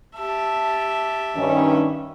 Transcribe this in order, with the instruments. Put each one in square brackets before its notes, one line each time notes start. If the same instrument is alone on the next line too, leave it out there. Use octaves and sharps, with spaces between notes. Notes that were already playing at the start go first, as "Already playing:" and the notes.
[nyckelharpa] G4 E5 [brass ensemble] A5
[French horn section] G2 D#3 C#4